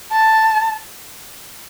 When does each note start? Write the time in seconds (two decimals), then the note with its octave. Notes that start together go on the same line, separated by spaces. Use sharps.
0.12 A5